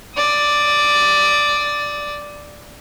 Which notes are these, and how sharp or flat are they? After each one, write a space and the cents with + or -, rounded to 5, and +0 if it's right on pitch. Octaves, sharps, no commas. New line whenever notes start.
D5 +0 D#6 +35